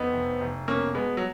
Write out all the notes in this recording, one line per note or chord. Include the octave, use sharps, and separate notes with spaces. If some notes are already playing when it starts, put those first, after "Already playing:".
Already playing: F2 B3 D#4
F1
F1
B2 A#3 C#4
B2 G#3 B3
F#3